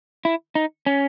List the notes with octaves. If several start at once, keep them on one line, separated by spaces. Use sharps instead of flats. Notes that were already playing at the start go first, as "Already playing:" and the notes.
E4
D#4
C#4